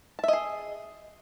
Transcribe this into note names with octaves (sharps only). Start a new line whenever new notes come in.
G#4 D#5 E5 A5